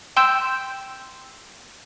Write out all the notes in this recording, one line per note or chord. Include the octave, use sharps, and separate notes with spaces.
G5 C6 E6 G6 E7